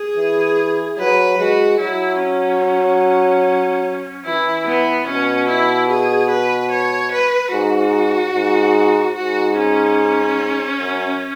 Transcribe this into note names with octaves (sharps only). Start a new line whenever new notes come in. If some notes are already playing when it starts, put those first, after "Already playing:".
Already playing: G#4
E3
F#3 B4
G#3 F#4
F#3 E4
C#4
E3 E4
B3
B2 C#4
E4
G#4
B4
C#5
B4
G#2 F#4
G#2
G#2 F#4
C#4
F#2